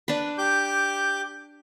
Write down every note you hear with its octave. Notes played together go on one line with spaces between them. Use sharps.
D4 B4
G4 D6 G6